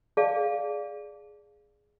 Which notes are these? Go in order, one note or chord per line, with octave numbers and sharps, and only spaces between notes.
G#4 D5 F5 A5